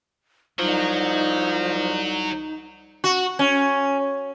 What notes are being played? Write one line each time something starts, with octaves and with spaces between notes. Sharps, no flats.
C2 F3 F#3 D#4
F#4
C#4